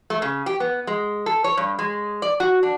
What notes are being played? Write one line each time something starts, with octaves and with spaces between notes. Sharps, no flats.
A3
C#3
G4
B3
G#3
A4
C#5
G2
G#3
D5
F#4
D4